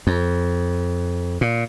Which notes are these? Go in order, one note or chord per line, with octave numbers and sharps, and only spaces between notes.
F2
A#2